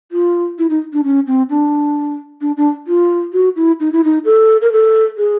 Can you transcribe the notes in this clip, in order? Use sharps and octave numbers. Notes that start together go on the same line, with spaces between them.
F4
E4
D#4
D4
C#4
C4
D4
D4
D4
F4
F#4
E4
D#4
E4
D#4
A4
A#4
A4
G#4